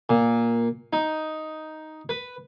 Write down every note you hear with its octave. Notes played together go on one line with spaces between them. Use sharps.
A#2
D#4
B4